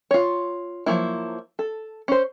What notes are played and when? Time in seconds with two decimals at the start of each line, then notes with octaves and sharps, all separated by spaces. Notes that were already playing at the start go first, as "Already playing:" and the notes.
0.11 F4 C#5
0.86 F3 F#3 A#3 E4
1.59 A4
2.08 C#4 C5